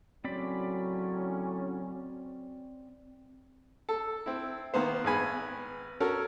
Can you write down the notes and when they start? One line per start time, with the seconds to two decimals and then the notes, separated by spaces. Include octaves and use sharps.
0.24 A2 C#3 F#3 C4 C#4 D5 B5
3.89 A4
4.26 C4 E4
4.74 D#3 A#3 B3 C5
5.04 G#1 G#3 B3 G#5 B5
6.00 C#4 F#4 A4 A#4